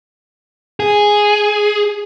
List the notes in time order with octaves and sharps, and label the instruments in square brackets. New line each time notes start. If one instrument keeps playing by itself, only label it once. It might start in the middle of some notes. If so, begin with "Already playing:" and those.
[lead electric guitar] G#4